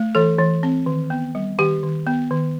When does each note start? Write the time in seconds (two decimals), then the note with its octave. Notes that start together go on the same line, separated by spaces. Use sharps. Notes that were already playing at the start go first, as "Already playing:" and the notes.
Already playing: A3
0.15 E3 A4
0.39 E3
0.63 C4
0.86 D#3
1.10 B3
1.35 G3
1.58 D#3 G4
1.83 D#3
2.07 B3
2.31 D#3